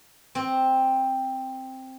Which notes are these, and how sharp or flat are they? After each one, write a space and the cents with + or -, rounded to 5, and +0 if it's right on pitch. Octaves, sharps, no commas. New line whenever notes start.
C4 +5